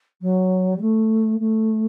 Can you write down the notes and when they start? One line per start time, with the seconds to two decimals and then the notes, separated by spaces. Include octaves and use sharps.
0.21 F#3
0.76 G3
0.81 A3
1.39 A3